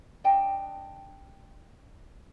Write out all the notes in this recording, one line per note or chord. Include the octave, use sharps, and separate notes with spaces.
D4 D#5 G5 A5